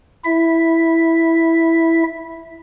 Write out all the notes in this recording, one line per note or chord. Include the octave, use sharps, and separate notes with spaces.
E4 E5